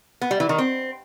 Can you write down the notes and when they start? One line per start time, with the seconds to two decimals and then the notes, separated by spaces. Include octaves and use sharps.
0.21 B3
0.31 G3
0.40 E3
0.49 D#3
0.58 C4